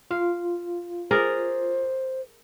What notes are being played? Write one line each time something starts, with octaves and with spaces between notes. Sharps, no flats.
F4 F5
G#4 A#4 C5 D5